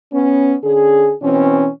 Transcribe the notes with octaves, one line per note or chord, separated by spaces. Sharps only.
B3 C#4
D3 C#4 G#4
B2 E3 C4 C#4